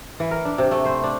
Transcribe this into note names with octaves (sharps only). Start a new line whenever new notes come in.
E3
A#4
D4
C3
A3
C5
D4